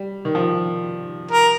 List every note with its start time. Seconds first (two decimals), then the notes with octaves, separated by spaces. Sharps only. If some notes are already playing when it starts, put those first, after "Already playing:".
Already playing: G3
0.25 D#3
0.35 F3
1.31 A#4